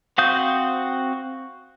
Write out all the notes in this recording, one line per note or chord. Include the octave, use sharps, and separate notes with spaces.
C4 F#4 F5 D#6 G6